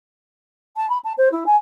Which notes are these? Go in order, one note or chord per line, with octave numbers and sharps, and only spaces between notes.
A5
B5
A5
C5
E4
G#5